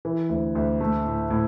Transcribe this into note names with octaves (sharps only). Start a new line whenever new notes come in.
E3
D2
D2
A3
A2
A2